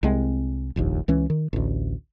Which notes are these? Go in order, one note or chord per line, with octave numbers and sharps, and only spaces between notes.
C2 G#3 C4
F1 A#1 D#2
C#2 E3 C#4
D#3
A1 D2